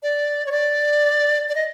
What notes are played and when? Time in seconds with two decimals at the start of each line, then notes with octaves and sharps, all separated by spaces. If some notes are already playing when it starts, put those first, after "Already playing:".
0.03 D5
0.46 C#5
0.52 D5
1.49 D5
1.55 D#5